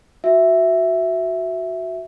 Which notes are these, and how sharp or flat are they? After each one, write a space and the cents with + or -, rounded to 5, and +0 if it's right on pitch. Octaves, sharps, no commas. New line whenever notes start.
F#4 +0 E5 +0